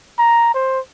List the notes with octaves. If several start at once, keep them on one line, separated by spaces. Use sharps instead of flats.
A#5
C5